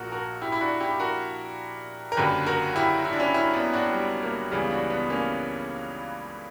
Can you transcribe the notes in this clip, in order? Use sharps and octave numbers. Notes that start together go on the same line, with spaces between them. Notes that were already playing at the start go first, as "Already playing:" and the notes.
Already playing: A#1 A#2 F#4 A#4
F#4 A#4
E4 G4
E4
D4 F#4
E4 G4
G4
F#4 A#4
A#4
F#1 F#2 D3 G4 B4
F#4 A#4
E4 G4
E4
D4
C#4 E4
C#4 E4
B3 D4
D4 F#4
G3
A#3
C#2 C#3 E3 G3 B3
D4 F#4
B3 D4
A#3 C#4